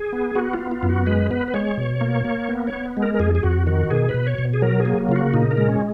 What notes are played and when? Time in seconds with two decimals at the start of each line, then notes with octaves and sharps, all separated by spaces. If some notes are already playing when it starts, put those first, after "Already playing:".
Already playing: G#4
0.13 B3
0.35 B3 F#4
0.53 F4
0.59 B3
0.71 F4
0.83 F#2
0.89 F#4
1.06 G#3 B4
1.31 B3 B4
1.48 B4
1.54 G#3 C#5
1.77 B2
2.01 A#3
2.25 A#3
2.49 B3
2.67 C#5
2.73 B3
2.97 G#3
3.02 A#4
3.14 A#4
3.19 F2 G#4
3.35 G#4
3.43 F2 F#4
3.67 D#3 F#4
3.90 B2 G#4
4.09 B4
4.14 B2
4.27 C#5
4.38 B2
4.54 G#4
4.62 F#3 A#4
4.80 G#4
4.85 A#3
5.09 C#3 F4
5.16 F#4
5.34 A#2 D#4
5.51 A#4
5.57 G#3
5.69 C#4